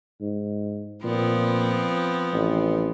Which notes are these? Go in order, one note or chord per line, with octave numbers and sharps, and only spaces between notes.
G#2
A#2 F3 B3 C4
A1